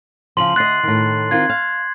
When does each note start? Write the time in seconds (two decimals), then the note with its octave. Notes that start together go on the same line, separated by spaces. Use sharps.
0.37 C#3 F3 C6 F#7
0.56 D2 D#5 F#6 A6 C7
0.83 A2 D#3
1.31 D#3 C4 F4 G#6
1.49 F5